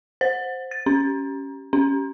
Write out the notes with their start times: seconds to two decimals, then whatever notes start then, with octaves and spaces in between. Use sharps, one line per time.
0.21 C5
0.71 A6
0.86 C#4
1.73 C#4